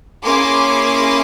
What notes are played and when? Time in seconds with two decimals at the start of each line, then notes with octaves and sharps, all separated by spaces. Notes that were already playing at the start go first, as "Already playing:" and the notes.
0.24 A#3 C#4 E4 G#4 C6 D6